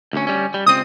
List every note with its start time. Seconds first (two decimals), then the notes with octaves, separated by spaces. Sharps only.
0.13 D2 C#4
0.27 G3 C#4
0.54 G3
0.66 C#2 C4 D#6